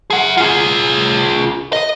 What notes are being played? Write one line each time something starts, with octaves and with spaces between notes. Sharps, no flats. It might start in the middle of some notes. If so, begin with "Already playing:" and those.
G#4 F#5
F4 G#4
D#5